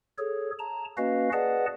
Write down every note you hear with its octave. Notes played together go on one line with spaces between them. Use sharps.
G#4 A4 C#5
A5 A#5
A#3 C#4 F#4 B4 D#5 F5
G#4 B4 D5 D#5 F#5 A5